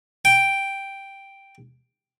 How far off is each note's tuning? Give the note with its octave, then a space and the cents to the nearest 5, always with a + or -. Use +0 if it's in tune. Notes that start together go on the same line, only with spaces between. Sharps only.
G5 +0